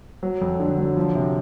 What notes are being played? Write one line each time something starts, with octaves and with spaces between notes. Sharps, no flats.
F#3
F2
D3
F#3
F3
C3